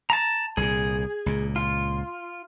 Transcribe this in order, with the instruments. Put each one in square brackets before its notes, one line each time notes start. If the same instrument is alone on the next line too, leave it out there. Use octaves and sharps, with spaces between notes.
[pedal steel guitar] A5 A#5
[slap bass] C2 A#2 [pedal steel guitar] G#4
[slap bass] C#2 A#2
[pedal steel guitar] F4